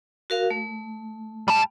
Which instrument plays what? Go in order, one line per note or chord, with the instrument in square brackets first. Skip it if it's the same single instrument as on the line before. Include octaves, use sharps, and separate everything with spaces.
[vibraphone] F#4 A#4 F5
A3
[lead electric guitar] G3 A5